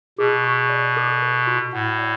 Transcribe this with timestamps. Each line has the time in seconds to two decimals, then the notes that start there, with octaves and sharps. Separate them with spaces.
0.18 B2 G#4
0.44 C#6
0.69 D5
0.96 A4
1.22 B4
1.47 F#4
1.73 A2 F#5
1.99 D5